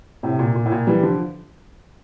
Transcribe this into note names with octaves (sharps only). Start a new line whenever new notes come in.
A2 C3
A#2
A#2
A2
A#2
E3 G3
D3 F3